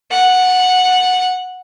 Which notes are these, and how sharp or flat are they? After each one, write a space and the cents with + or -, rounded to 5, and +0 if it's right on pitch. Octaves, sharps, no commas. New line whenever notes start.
F#5 -10